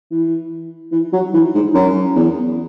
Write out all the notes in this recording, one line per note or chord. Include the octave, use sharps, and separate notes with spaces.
E3
E3
F#3
E3
G#2
F#2
E2